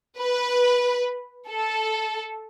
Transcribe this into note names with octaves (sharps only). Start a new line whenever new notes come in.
B4
A4